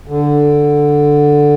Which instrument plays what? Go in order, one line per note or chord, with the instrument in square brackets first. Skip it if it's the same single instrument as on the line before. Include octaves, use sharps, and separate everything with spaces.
[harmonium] D3